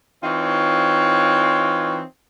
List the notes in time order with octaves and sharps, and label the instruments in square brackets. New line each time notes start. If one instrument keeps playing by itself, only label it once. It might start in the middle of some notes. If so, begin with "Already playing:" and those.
[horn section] E3 C4 D#4 F4 C#5